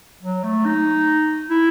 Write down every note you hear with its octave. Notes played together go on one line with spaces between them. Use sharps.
F#3
A3
D#4
E4